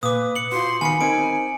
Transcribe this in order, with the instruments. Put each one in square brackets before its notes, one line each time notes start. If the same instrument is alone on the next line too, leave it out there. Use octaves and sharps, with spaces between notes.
[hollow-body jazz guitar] A#2 [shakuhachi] B4 [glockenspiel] D6 D#6
[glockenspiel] C#7 F#7
[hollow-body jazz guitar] F4 F#4 [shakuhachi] C6
[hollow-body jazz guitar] D#3 B3 [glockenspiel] G#5 C#7 [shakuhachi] B5
[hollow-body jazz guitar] C4 D#4 A#4 [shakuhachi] G#5 [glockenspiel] D7